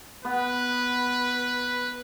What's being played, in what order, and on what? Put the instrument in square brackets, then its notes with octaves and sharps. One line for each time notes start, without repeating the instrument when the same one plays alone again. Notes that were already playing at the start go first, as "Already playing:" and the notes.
[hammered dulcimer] B3 [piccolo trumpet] B4